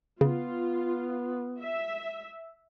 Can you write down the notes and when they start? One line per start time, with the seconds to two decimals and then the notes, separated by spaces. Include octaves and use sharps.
0.21 C#3 B3 F4
1.60 E5